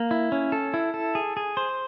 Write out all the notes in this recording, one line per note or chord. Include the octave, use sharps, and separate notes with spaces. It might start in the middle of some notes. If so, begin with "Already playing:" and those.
Already playing: A#3
E4
C#4
A4
E4
A4
G#4
G#4
C5